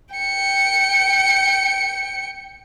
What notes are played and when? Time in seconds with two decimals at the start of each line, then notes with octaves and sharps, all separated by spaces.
0.15 G5 C#7